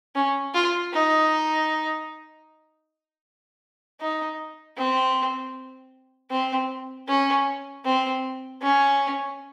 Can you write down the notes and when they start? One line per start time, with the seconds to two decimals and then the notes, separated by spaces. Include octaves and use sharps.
0.15 C#4
0.54 F4
0.93 D#4
4.00 D#4
4.77 C4
6.31 C4
7.08 C#4
7.85 C4
8.62 C#4